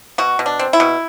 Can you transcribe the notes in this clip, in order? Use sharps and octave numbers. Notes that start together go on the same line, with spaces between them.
B2 F#4
B2
D4
C4
E4
B2